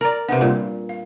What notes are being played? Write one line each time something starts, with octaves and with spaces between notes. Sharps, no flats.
A#4 D5 A#5
C3 B3 D4 B4
A#2 G3 A#3
F5